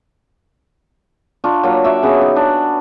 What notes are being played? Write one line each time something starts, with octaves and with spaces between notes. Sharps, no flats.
D4 F4 C#6
F#3 A#3 F4
F#4 D5 E5
C#3 B3
D#4
D4